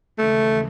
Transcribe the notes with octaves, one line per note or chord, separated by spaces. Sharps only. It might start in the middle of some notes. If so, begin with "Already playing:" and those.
D#2 C#3 E3 G#3 A3